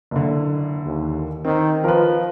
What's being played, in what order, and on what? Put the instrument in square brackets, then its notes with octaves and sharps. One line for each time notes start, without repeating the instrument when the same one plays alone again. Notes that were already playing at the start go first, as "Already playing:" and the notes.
[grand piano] F#1 D3
[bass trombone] D#2
[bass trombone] D#3 [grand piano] C4
[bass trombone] F3 [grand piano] A#4 B4